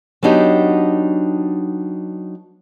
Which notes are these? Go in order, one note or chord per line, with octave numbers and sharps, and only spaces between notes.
F#3 B3 D4 D#4 G4